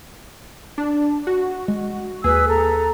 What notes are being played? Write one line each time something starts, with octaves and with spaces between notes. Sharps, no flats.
D4
F#4
G#3
D#2 G#4 B4 E6
A4 A#5